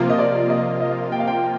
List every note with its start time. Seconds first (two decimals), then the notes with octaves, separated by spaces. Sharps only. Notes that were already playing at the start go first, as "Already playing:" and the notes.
Already playing: C3 F3 A#3 F4
0.10 D#5
0.19 D5
0.50 D#5
0.80 D#5
1.12 G5
1.20 F5
1.27 G5